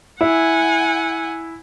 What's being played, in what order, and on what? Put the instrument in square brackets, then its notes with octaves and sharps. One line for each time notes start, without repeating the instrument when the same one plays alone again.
[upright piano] E4 [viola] F#5 G#5